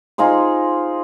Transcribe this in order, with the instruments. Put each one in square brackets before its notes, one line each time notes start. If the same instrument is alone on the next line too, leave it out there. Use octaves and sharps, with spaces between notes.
[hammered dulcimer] D#4 F4 G#4 C5